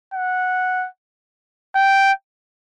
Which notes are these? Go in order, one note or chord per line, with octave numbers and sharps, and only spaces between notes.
F#5
G5